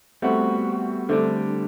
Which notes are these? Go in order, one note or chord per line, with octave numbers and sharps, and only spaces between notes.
G3 A3 B3 C4 F#4
D3 G3 A3 C4 D4